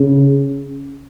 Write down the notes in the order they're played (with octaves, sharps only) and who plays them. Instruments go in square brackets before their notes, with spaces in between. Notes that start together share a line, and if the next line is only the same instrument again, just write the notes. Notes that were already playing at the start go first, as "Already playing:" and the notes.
Already playing: [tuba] C#3